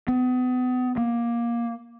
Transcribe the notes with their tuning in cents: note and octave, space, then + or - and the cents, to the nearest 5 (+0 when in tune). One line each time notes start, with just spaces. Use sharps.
B3 +35
A#3 +15